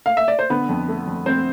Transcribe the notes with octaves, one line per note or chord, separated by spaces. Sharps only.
F5
E5
D5
C5
D3 B3 B4
F2
A3
F2
F2 C4 C5